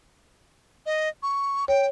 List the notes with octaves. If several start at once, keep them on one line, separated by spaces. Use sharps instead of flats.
D#5
C#6
C#5 G5